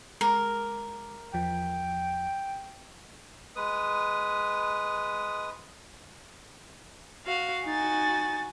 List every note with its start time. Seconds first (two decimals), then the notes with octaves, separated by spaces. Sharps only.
0.21 G#3 A#4 D6
1.34 E2 F3 G5
3.56 G#3 B4 D#6
7.26 F#4 F5
7.65 D#4 F#4 G#5 A6